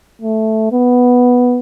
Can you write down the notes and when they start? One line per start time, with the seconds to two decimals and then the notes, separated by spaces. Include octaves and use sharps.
0.22 A3
0.72 B3